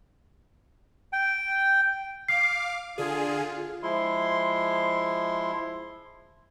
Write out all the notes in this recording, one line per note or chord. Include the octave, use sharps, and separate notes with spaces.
G5
F5 D6 C7
D3 F4 G#4
F3 G#3 E4 C6